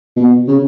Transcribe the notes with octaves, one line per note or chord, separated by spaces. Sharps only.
B2
C#3